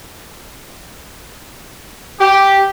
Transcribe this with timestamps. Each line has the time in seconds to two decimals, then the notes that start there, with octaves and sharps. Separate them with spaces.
2.20 G4